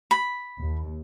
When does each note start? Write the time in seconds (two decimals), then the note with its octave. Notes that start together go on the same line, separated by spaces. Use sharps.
0.11 B5
0.59 D#2